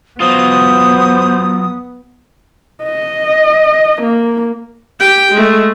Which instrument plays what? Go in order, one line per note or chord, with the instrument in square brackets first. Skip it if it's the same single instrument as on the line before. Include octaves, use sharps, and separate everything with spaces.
[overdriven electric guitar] F#3 F4 [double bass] B3 [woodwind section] C5 [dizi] D#6
[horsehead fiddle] D#5
A#3
[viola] G4 G5
G#3 A3